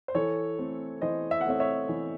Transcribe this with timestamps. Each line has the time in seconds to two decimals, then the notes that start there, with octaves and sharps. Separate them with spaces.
0.08 C5
0.15 E3 A4 C#5
0.59 A3 C4
1.02 E3 C5 D#5
1.31 E5
1.41 F#5
1.45 A3 C4 C#5 E5
1.60 C#5 E5
1.89 E3